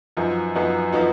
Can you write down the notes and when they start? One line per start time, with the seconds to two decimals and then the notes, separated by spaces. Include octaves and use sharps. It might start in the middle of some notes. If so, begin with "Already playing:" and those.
0.17 F#2 F3 B3 D#4 F#4
0.55 F#2 F3 B3 D#4 F#4
0.93 F3 B3 D#4 F#4